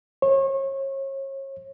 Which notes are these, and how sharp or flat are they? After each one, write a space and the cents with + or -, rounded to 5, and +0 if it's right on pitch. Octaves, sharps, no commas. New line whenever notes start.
C#5 -35